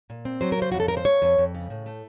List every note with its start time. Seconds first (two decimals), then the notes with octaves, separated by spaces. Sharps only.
0.10 A#2
0.25 C4
0.41 F#3 C5
0.52 A#4
0.58 C#3 C5
0.72 F2 F#4
0.80 A4
0.88 C#3 A#4
0.97 C5
1.05 F2 C#5
1.22 F2
1.38 F2
1.54 C#3
1.70 A2
1.86 A3